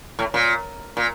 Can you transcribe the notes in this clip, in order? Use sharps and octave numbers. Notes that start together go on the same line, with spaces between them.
A2
A#2
A#2